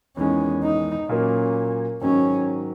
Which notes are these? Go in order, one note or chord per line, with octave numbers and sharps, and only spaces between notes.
E2 D#3 G#3 C#4
D#4
A#2 F#3 A#3 C#4
G#2 D#3 F#3 C#4